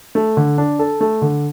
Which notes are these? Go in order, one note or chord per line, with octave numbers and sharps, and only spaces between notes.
A3
D3
D4
A4
A3
D3